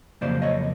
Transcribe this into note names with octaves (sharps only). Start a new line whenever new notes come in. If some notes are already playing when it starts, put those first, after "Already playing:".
F2 C#3 F#3 A#3 C5 D5
C#5 D#5